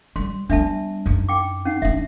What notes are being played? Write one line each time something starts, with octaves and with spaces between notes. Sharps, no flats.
G3 C6
G3 B3 D4 E5 A5
F#2 D#4
G5 D6
C#4 D#4 F#5
D4 D#4 E5